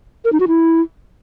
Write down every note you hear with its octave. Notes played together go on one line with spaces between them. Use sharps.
A#4
D#4
F#4
E4